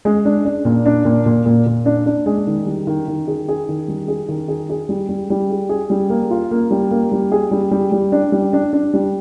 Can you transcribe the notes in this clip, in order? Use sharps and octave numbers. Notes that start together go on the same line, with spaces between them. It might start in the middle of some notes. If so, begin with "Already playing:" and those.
G#3
D4
D4
A#2
D4
A#2
A#2
A#2
A#2
D4
D4
G#3
D#3
G3
D#3
D#3
G#4
G#4
D#3
G3
G#4
D#3
G#4
G#4
G3
G3
G3
G#4
G#4
G3
A#3
F4
A#3
G3
A#3
G3
G#4
G3
G3
G3
D4
G3
D4
D4
G3